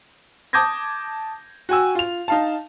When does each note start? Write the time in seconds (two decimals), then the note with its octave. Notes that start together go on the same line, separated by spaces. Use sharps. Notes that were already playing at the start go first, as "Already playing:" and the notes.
0.53 A5 D6 D#6 G6 G#6 A#6
1.69 F#4 G5 G#5 E6
1.95 F4 F7
2.28 D#4 F5 A5